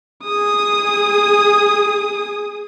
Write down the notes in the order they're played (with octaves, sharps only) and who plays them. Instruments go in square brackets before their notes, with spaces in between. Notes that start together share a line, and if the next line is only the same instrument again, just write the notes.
[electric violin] G#4 D#6